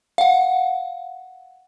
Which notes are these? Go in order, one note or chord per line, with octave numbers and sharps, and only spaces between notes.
F5 F#5